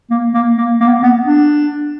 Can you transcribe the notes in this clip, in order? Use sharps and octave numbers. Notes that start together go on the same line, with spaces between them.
A#3
A#3
A#3
A#3
B3
A#3
B3
D4